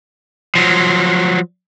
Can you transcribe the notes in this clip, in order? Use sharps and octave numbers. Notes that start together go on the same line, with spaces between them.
F3 F#3